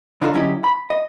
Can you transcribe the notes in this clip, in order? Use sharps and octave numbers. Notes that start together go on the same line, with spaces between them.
C#3 D4 D#4 F4 G4 A4
D3 F#3 C#4 E4 G4 D#5
B5
D#5